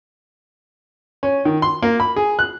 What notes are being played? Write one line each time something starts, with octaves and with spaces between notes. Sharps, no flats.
C#4
D#3
C6
A#3
B5
G#4
F#6